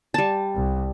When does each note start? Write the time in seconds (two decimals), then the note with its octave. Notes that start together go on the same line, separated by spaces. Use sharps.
0.14 G3 A5
0.56 C2